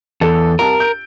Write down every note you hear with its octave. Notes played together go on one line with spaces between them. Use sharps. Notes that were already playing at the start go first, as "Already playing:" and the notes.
E2 A4
C2 A#4 A5
G6 D7